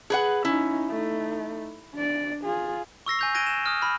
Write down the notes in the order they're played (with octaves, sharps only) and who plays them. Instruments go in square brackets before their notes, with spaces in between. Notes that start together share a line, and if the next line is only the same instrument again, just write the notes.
[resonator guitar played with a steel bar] G#4 B4 F#5
[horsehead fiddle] C#4 D#4 [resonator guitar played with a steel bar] E4
[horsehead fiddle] A3 D#4
D4 D5
F4 G#4
[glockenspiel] C#6 E6 A#6 C7
G#5 G6 F7
F#6 G#6 A#6 D7 D#7 G7
E7
D#6 F6
B5 F6